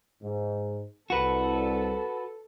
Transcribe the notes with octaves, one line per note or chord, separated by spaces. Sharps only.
G#2
C2 F#4 A4 B4